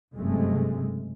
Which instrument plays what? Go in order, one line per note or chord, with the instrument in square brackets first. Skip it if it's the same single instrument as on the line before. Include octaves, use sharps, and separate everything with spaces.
[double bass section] F#1 G2 C3 G#3 A3